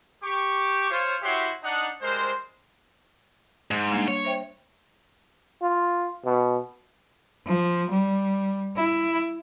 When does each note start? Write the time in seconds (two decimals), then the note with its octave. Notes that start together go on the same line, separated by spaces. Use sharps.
0.23 G4 C#6 D6
0.91 F4 C5 C#5
1.22 E4 F#4 G4 C#5 E5 C6
1.63 D4 D#4 F#5
2.01 G3 G#3 A#4 C5
3.71 G#2
3.92 G3 A#3 D4
4.08 C#5
4.25 C5 E5 G5
5.62 F4
6.25 B2
7.46 F3
7.90 G3
8.77 E4